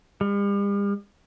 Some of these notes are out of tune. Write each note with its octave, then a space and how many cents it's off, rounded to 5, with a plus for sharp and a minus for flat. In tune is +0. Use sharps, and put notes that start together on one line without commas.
G3 +45